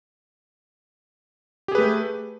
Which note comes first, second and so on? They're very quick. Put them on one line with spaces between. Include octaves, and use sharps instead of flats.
G4 G#4 B4 A3